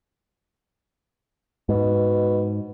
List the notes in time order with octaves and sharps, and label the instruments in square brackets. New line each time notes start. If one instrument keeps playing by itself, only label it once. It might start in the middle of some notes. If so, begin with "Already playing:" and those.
[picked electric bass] G#2 [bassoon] B2